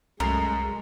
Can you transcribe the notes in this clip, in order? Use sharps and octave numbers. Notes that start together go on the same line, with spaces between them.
C2 F#2 G#3 A3 A#4 C7